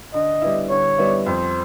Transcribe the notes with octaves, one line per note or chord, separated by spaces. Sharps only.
D3 D#5
G3 B3 E4
D3 C#5
G3 B3 E4
F2 C5